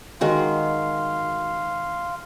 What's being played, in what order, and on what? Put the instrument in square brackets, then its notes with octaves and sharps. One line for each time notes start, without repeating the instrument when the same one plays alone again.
[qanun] D#3 G#3 F#4 [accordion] F5 C6